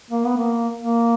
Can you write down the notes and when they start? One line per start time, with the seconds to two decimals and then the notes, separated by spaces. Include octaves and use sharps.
0.11 A#3
0.25 B3
0.37 A#3
0.80 A#3